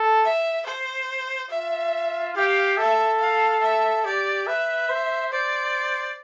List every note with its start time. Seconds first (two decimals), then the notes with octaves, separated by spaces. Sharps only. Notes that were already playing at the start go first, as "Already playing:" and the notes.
Already playing: A4
0.24 E5
0.66 C5
1.50 F4 E5
2.35 G4 F5
2.78 A4 E5
3.21 F5
3.62 E5
4.05 G4 D5
4.47 B4 E5
4.90 C5
5.32 C5 D5